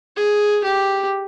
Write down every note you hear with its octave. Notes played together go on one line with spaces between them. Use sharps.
G#4
G4